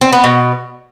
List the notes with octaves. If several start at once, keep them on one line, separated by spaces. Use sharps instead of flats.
C4
B3
B2